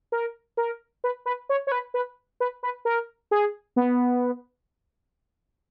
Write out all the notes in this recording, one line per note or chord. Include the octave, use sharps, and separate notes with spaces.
A#4
A#4
B4
B4
C#5
C#5
B4
B4
B4
B4
A#4
G#4
B3